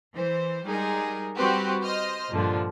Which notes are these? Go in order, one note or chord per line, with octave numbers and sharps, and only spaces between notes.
E3 C5
G3 G#3 D#4 G#4 A#4
G3 C4 F#4 G4 B4 C5
C5 D#5 F6
G2 A#2 D3 F3